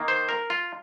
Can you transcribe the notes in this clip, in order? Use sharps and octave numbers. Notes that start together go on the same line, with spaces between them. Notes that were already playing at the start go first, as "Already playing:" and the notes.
Already playing: D#3 A#3
C5
A#4
F4